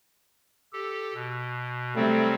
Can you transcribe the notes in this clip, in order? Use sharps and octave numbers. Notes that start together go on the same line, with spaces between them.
G4 A4
B2
C3 F#3 G3 A3 C4